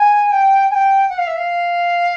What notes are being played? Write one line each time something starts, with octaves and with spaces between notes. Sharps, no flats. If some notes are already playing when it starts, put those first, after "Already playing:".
Already playing: G#5
G5
G#5
G5
F#5
F5
E5
F5